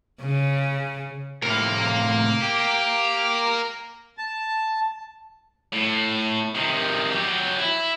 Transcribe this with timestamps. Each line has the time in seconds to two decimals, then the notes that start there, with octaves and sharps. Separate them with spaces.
0.21 C#3
1.43 A2 C3 A#4 F5
2.42 G4
4.18 A5
5.73 A2
6.55 C3 D#3
7.12 F#3 G4
7.59 E4